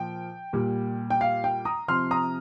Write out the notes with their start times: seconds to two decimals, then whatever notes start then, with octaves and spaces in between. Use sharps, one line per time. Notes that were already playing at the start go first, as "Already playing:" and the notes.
Already playing: A#2 F3 G5
0.53 A#2 G3
1.10 G5
1.21 F5
1.44 G5
1.65 A#5 D#6
1.88 C3 F3 C6 F6
2.11 A#5 D#6